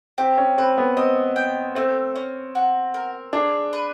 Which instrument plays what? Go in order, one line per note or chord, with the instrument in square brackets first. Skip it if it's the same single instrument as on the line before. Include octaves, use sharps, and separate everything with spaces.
[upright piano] C4 [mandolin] G4
[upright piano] C#4
[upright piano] C4 [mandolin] B4
[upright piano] B3
[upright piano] C4 [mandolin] D#5
[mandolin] G5
[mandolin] A3 [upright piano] C4
[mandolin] C#4
F#4
A#4
[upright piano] D4 [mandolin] G#4
[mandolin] B4